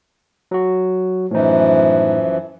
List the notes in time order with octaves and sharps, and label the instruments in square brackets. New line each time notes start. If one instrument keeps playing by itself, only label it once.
[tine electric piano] F#3 F#4
[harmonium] F#2 E3 F3 [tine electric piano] A2 D#4